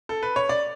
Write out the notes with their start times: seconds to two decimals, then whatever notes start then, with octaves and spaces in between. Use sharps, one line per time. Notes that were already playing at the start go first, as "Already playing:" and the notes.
0.09 A4
0.23 B4
0.36 C#5
0.49 D5